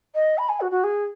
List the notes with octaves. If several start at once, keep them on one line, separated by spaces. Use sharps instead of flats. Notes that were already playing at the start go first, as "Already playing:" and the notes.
D#5
B5
G#5
F#4
F#4
G#4